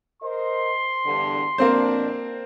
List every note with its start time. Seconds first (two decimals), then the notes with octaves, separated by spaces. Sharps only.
0.23 A#4 C5 D#5 C6
1.05 E2 G2 D3
1.58 F2 B2 A#3 C4 D4 C5